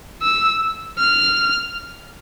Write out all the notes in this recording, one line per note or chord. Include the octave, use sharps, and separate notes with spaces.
E6
F6